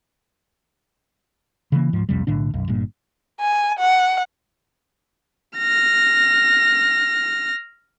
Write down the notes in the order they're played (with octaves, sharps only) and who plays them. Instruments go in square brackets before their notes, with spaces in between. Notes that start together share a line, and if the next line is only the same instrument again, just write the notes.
[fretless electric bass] C#3 E3 G3 A#3
D1 G#2 F3
C2 F2 C3 G3
B1 A2 D3 D4
B1 F#2
G1 G2 A#2
[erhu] G#5
F#5
[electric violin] F6 A#6